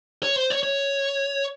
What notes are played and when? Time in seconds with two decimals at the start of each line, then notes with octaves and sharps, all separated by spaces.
0.23 C#5
0.36 C5
0.50 C#5
0.63 C#5